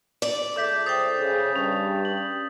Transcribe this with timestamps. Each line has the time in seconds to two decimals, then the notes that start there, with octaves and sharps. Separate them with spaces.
0.22 D5
0.56 C#2 A4 E5 D6 G6 B6
0.86 C5 G5 D#6 A6
1.20 C#3
1.56 G2 C#4
2.05 F#7